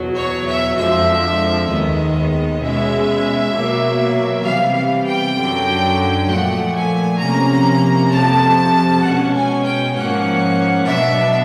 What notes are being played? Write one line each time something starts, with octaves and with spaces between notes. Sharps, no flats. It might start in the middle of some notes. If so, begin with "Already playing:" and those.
Already playing: E2 B2 F#3
C#5
E5
F2 D3 F3 G#3 E5
D#2 D#3 G#3 B3 D#5
B2 G#3 C#4 E5
B2 F#3 A#3
C3 E3 G3 B3 F5
F5
G5
F#2 D3 F#3
A#2 F3 A3 F#5
G#5
C3 F3 A#3 C#4 A#5
F2 C3 F3 A5
B2 G#3 C#4 F#5
G#5
G5
G#2 F3 A#3 C#4 F#5
B2 F#3 B3 D4 E5